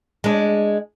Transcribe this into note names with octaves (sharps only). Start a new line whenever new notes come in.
G#3 D4